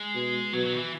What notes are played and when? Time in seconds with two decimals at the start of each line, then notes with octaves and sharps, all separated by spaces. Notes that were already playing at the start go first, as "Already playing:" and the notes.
Already playing: G#3
0.15 B2
0.53 B2 F#3
0.65 F#3
0.73 D#3
0.78 E3